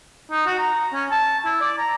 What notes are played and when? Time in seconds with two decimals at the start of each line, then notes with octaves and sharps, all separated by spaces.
0.31 D#4
0.46 F#4
0.58 A#5
0.94 C#4
1.11 A5
1.45 E4
1.61 D5
1.78 A#5